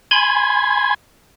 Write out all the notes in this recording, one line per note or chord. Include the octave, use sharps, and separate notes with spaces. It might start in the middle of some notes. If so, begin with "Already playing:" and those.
G#5 B5 C6 G#6